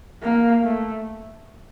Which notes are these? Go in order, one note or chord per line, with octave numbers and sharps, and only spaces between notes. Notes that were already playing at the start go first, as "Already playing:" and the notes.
A#3
A3